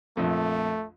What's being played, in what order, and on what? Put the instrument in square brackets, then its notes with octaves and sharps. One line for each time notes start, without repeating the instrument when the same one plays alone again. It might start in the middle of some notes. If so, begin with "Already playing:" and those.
[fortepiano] A#1 F2 [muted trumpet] A3